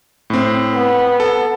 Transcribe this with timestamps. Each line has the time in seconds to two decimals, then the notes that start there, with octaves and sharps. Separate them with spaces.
0.30 A2 C4
0.74 B3
1.20 A4